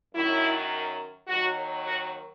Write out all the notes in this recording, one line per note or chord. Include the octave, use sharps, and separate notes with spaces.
F#2 D#3 F#3 E4
D#2 D#3 F#3 F#4
F#4